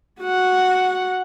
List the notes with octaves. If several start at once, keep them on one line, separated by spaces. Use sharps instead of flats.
F#4 F#5